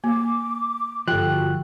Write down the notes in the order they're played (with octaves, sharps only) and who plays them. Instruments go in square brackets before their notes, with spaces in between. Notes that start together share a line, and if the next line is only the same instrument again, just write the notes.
[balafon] A#3 [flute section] D6
[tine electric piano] G1 F#6 [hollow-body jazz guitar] F3 G4 [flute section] F#4 A4